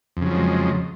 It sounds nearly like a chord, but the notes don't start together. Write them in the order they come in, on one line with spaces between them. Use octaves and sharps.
F2 C#3 F#3 F3 G#3